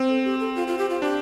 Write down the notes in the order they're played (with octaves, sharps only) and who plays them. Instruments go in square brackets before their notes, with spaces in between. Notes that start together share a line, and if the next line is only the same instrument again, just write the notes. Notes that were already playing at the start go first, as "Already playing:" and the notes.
Already playing: [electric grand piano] C4
[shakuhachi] A4
G4
A4
F4
F4
G4
F4
[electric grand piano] D4 [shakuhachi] G4